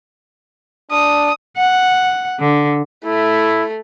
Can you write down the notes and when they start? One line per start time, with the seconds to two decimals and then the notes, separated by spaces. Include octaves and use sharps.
0.91 D4 D#6
1.57 F#5
2.40 D3
3.05 A3 E4